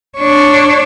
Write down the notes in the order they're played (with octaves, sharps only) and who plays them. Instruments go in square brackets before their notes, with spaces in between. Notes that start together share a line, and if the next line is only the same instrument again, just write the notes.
[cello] D4 C#5